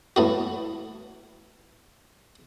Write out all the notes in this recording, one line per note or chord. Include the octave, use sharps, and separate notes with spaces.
A2 B3 F#4